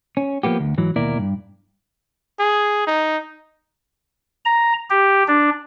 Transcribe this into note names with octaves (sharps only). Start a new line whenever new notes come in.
C#4
F3 A#3 B3 G4
D2
G#2 E3 F#3
D#2 B2 A#3 E4 A#4 D5
G2
G#4
D#4
A#5
G4
D4